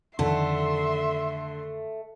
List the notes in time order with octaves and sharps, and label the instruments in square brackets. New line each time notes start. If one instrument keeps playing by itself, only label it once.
[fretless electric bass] F2 D#3 [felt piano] D3 [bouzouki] A3 [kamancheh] E5 C6